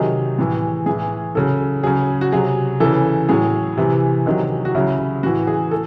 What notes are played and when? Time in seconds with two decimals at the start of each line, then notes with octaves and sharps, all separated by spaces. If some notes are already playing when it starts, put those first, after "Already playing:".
Already playing: C3 D#3 F#3 G#4
0.39 A2 E3
0.86 A2 E3 G#4
1.35 C#3 F#3 A4
1.83 C#3 F#3 G#4
2.21 F#4
2.32 C3 F#3 G#4
2.80 C#3 E3 A4
3.29 A2 F#3 G#4
3.77 C3 E3
4.26 C3 D#3 F#3
4.65 F#4
4.75 C#3 F#3 E4
5.23 A2 E3 F#4
5.47 G#4
5.71 A4